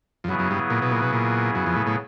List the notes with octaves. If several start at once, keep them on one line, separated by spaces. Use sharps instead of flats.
F2
F#2 C#3 F#3 B3 E4 G#4
F#2
G2
A#2
B2
A#2
B2
A#2
F#2
F2
A2
A2